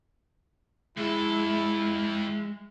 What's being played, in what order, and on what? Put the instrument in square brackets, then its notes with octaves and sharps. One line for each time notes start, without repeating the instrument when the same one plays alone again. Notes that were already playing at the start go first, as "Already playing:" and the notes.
[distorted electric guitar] F2 A4 [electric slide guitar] G#3 [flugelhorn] E4